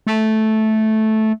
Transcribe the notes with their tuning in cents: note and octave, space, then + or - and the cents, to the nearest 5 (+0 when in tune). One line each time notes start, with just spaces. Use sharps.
A3 -10